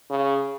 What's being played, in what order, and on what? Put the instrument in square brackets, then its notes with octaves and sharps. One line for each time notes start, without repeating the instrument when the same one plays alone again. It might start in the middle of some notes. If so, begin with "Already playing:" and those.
[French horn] C#3